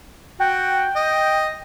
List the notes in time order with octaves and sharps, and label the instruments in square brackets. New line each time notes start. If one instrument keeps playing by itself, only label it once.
[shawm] F#4 [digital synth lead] G5
[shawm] D#5